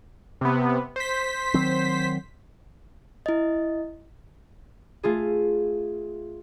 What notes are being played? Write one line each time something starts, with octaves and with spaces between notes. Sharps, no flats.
C3 B3
C5 B6
D#3 F#3 C4
E4 D#5
A3 F4 G#4